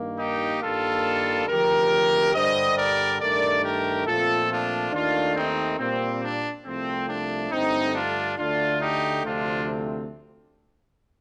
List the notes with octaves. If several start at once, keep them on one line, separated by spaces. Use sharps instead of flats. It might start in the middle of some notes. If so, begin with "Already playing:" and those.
Already playing: G2 D#3 A#3
D#4 G4
G2 D#3 G3 A#3 F4 A4
D2 C3 F3 G4 A#4
G2 D3 G3 C5 D#5
A#4 D5
G2 D#3 A3 A#4 D5
G4 A#4
A#2 F3 A3 C4 F4 A4
D4 F4
D#2 D#3 A3 D4 F4
C4 D#4
A#2 G3 A#3 C4
D4
C2 C3 F3 A3 C4
D4
G2 D3 A3 C4 D#4
D4 F4
D2 D3 A3 D4 F4
D#4 G4
D2 C3 F3 A3 C4 D4 F4